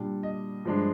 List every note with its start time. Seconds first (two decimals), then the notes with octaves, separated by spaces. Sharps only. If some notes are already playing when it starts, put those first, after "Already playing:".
Already playing: A#2 G3 D4
0.23 D#5
0.65 G2 F3 G#3 D4